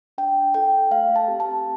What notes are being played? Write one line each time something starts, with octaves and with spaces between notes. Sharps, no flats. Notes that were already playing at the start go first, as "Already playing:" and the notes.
D4 G5
F4 A4 G5
A3 F5
A5
C4 G4
A5